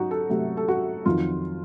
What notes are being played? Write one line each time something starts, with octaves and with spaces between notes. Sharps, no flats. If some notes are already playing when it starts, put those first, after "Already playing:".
Already playing: F#3 D#4 F#4
A4
C3 F#3 A3
A4
F#4
F2 D#3 F#3 F4